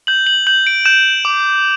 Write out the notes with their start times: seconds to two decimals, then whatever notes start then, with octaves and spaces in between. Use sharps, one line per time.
0.07 G6 F#7
0.27 F#7
0.47 G6 F#7
0.67 D7
0.85 G6 E7
1.25 D6